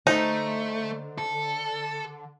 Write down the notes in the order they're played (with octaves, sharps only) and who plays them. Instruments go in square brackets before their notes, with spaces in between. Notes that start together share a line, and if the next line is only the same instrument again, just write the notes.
[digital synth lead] D3 [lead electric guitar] A3 [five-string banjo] D#4 [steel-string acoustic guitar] C5
[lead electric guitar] A4